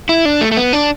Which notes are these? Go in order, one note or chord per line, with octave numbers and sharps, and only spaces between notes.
E4
D4
A3
A3
B3
D4